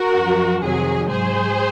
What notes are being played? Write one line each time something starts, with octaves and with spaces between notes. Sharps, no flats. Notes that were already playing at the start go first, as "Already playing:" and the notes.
Already playing: F#4 A#4
F#2 F3
F2 C3 D#3 F#3 G#4
G#2 F#3 G#4 C5